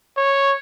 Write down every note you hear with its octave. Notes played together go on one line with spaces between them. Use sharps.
C#5